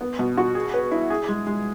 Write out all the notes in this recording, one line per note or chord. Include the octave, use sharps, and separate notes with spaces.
B3
B2
F#4
G#4
B4
E4
G#4
G#3
G#3